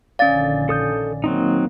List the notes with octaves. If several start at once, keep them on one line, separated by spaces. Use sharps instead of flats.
A#1 D3 D#3 C#4 D5 F5 A6
A4 D#6 G6
D#3 F#3 A#3 C4 D#4